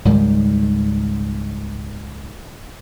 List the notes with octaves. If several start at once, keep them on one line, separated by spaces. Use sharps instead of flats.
C#2 G#2 D#3 G3